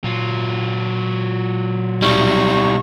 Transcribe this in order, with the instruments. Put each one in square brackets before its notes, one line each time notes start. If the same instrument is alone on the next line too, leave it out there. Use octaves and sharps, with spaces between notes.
[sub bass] A#2 [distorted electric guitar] F#3 F4
[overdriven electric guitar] B1 G3 [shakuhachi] C#6